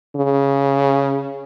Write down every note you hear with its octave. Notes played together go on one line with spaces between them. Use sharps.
C#3